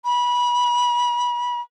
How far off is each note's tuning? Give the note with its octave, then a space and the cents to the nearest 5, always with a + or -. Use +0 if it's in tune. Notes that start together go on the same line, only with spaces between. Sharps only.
B5 -25